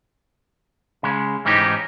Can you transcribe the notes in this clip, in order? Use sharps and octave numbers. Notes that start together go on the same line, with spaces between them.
C#3 G#3
G#2 E3 C#4 D#4 G4